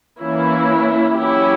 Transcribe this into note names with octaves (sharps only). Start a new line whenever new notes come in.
E3 A#3 C#4 E4
F#3 C#4 E4 G4